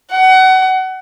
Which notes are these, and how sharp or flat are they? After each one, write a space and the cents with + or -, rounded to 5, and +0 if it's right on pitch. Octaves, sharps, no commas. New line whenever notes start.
F#5 +25